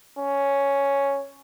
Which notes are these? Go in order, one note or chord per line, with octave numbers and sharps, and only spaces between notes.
C#4